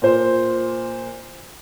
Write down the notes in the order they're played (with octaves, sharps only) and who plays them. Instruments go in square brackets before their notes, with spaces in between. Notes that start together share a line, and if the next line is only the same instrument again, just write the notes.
[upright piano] A#2 C5